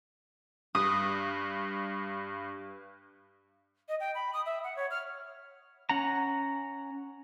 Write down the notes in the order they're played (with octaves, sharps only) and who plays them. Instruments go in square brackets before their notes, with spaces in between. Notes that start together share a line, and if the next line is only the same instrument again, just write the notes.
[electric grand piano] G2 [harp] D#6
[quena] D#5
G5
B5
D#6
E5
F#5
C#5
F6
[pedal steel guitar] C#4 F#5 A#5